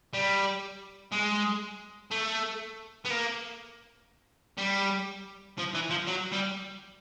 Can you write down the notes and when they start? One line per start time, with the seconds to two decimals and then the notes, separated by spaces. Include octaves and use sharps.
0.14 G3
1.12 G#3
2.11 A3
3.05 B3
3.10 A#3
4.58 G3
5.58 F3
5.74 E3
5.90 F3
6.07 F#3
6.32 G3